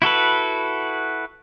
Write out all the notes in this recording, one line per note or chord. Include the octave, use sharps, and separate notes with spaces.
E4 F#4 A4 B4